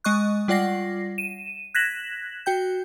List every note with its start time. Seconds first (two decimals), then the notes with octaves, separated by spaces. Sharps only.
0.04 G#3 D#5 C#6 F#6
0.48 G3 F4 D5 F#5 A#6 C7
1.18 D#7 E7
1.75 F#6 G#6 A#6 B6 E7 F#7
2.46 F#4 G5 G6